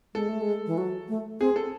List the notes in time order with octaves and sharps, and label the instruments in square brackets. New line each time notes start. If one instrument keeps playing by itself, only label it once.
[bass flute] G#3 [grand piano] A4
[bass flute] A3
G#3
E3
F#3
A3
[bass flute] C4 [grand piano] G#4
[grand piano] A4